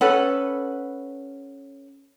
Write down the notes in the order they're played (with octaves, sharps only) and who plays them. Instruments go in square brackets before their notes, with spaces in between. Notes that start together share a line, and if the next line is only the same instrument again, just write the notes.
[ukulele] C#4 A4 B4 F#5